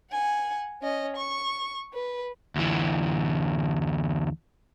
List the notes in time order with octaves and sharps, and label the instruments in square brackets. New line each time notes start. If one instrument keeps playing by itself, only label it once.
[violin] F#5 G#5
C#4 D#5
C#6
B4
[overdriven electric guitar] D2 E3